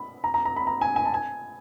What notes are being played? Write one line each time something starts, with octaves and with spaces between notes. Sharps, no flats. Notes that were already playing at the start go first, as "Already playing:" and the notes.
Already playing: B5
A#5
A#5
A#5
B5
A#5
G#5
G#5
A5
G#5